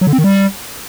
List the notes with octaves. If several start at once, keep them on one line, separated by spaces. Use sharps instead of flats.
F#3
D3
C4
D#3
G3